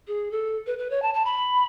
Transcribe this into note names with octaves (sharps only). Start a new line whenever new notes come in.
G#4
A4
B4
B4
C#5
A5
A5
B5